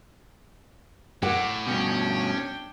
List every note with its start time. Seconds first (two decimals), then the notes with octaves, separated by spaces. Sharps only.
1.23 A2 F#5 D6
1.67 G2 B2 C#4 D4 G5